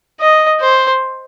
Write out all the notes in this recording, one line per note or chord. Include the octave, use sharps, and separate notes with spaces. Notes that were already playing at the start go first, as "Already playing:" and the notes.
D#5
C5